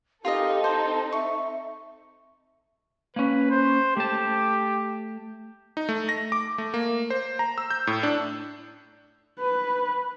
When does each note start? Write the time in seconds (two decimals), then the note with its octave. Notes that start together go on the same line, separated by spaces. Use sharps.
0.25 C4 D#4 F4 G4 A4 A#4 D#5
0.64 C5 A5
1.12 E5 C#6
3.16 A#3 C#4 B4
3.50 C5
3.97 A3 G4 A5
5.77 D#4
5.89 A3
6.09 A#6
6.32 D6
6.58 A3
6.74 A#3
7.10 C5
7.39 A#5
7.58 E6
7.70 G6
7.87 A2
8.03 D4
9.39 B4